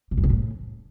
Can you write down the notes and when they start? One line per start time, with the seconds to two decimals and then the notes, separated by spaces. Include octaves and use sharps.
0.11 B2
0.17 F#2
0.24 C3
0.30 A2